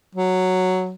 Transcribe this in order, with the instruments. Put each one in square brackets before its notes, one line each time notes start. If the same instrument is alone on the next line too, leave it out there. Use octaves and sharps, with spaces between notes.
[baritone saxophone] F#3